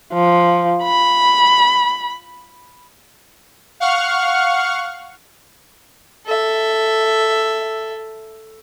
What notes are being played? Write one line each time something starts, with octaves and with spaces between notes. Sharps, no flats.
F3
B5
F5 F#5 C#6 F6
A4 E5